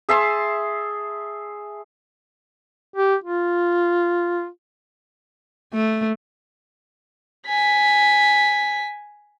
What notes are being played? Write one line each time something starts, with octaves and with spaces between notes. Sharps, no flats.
G#4 E5 A5 C6
G4
F4
A3
G#5 B6